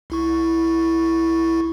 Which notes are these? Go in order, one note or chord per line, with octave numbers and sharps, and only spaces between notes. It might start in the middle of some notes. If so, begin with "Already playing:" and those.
C2 E4 C#6